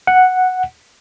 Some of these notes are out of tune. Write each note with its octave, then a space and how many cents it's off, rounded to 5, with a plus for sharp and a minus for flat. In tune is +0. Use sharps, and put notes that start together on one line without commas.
F#5 -5